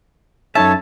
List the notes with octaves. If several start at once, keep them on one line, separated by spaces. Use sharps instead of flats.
F#2 D#4 A4 C#5 E5 A5